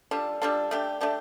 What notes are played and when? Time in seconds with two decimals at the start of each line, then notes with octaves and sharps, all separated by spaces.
0.11 G3 D4 F4 A4
0.42 G3 D4 F4 A4
0.71 A3 D4 G4
1.01 A3 D4 G4